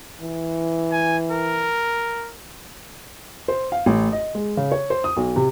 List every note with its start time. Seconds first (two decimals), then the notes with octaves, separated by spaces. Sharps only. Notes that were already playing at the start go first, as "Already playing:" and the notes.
0.21 E3
0.92 G#5
1.31 A#4
3.48 C5
3.72 F5
3.86 A1
4.12 D#5
4.35 G#3
4.57 C#3
4.72 C#5
4.90 C5
5.04 D#6
5.17 B1
5.36 C3